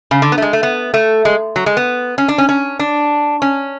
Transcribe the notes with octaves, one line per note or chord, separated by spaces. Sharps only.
C#3
D3
B3
A3
G#3
A3
B3
A3
G#3
F#3
G#3
B3
C#4
D4
C#4
C#4
D4
C#4